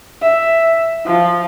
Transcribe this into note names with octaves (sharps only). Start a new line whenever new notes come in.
E5
F3